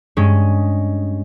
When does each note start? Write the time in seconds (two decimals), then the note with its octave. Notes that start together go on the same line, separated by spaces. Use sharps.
0.17 G2 G#3 C#4